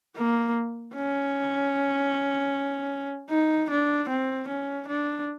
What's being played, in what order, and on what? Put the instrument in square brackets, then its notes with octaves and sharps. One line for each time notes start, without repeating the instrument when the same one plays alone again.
[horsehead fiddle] A#3
C#4
D#4
D4
C4
C#4
D4